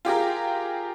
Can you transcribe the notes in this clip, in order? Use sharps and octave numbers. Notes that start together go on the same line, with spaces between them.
F4 G4 G#4 A#4